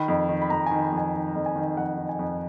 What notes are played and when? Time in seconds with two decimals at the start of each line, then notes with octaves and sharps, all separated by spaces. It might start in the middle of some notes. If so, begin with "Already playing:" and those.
Already playing: D#3 B5
0.08 F2
0.29 D#3
0.42 B5
0.50 F2 A#5
0.66 D#3 G#5
0.82 B5
0.92 F2
0.98 G#5
1.14 D#3
1.35 F2
1.46 G#5
1.56 D#3
1.77 F2 F#5
1.98 D#3
2.09 G#5
2.19 F2